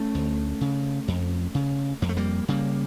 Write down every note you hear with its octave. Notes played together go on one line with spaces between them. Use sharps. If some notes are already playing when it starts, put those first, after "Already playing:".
Already playing: A3 C#4
D2
C#3
F2
C#3
F2 A#3
A3
G3 A#3
C#3 G3 A#3